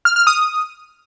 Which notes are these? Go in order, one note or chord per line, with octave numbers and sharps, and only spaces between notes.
F6
F6
D#6